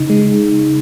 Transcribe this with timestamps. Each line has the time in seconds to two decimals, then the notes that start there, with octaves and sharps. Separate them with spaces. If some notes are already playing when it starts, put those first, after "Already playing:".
Already playing: C#3 D#4
0.10 G#3